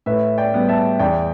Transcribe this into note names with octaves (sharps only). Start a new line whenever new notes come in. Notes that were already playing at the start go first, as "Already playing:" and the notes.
A2 B4 E5
D5 G5
G3 B3
E5 A5
E2 D5 G5